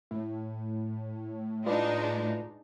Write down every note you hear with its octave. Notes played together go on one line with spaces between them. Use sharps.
A2
G#3 D4 D#4 F4 B4 D5